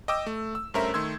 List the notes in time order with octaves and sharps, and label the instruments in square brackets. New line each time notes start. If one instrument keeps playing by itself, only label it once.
[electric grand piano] D#5 G5 D6 E6
A3
E6
G2 A3 C#4 A#4 C5 E5
D#3 A3 C6 E6 G#6